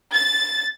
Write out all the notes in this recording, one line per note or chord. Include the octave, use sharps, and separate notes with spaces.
A6